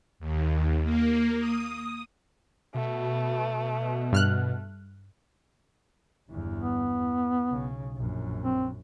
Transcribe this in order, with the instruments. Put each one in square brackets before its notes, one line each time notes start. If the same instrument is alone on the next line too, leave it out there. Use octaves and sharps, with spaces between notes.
[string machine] D#2
A#3
D#6
[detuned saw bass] B2 [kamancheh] A3
[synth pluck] G2 F6 F#6
[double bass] G1 E2
[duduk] B3
[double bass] E2
B1 C#3
A#1 F#2
[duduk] C4